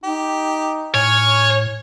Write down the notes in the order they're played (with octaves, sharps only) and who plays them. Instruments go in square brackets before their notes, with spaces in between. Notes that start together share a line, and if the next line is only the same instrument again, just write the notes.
[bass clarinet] D#4 [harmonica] G4
[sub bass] A2 [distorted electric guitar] C#5 [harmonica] G#5 F6